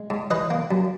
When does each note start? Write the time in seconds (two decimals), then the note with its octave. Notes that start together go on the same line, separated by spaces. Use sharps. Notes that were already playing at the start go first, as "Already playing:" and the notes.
Already playing: G#3
0.10 G#2
0.31 E3 B4 D#5
0.50 A#3
0.71 F#2